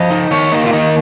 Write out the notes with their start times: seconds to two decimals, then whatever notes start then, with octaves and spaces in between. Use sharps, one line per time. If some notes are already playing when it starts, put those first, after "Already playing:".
Already playing: F3 D#5
0.10 D#4
0.31 D#3 C#5
0.52 A#3 D#4
0.66 F4
0.73 D#3 D#4